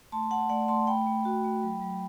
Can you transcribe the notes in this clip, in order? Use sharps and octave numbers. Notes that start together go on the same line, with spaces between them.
A3 A5 C6
A3 F#5 A5
A3 D5 F#5
A3 A5 C6
A3 G5 B5
A3
F#4
A3
F#3
F#3